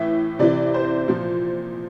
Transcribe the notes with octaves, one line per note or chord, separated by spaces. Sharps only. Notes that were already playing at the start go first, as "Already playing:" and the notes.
Already playing: A2 E3 E5
C3 E3 D5
C5
A#2 F3